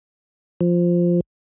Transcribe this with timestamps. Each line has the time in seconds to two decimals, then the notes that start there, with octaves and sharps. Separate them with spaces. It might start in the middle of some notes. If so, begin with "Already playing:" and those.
0.61 F3